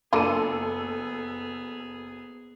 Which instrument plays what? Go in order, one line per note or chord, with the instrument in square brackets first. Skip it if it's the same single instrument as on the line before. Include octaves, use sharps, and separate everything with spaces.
[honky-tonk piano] F#1 A4 D#7 [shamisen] A#3 D4 F4 [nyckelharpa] B3 G#4